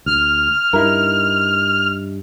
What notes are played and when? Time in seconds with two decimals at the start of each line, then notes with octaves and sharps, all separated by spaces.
0.06 D2 F6
0.73 G2 D#4 E4 A#4